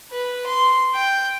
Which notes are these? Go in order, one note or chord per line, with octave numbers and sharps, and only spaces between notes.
B4
C6
G5